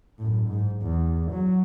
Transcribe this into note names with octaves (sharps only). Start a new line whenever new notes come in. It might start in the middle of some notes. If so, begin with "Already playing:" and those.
F#2 A2
G#2
E2
F#3